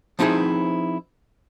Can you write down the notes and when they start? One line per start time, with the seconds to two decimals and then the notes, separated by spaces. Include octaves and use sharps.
0.19 F3 C4 D#4 E4 G#4 B4